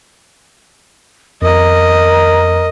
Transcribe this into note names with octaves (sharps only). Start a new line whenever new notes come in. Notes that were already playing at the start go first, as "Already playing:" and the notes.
F2 A#4 D#5